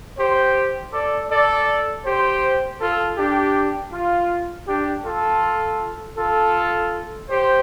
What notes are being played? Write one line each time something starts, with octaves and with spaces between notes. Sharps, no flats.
G4 C5
A4 D5
A4 D5
G4 C5
F4 A4
D4 G4
F4
D4 G4
F4 A4
F4 A4
G4 C5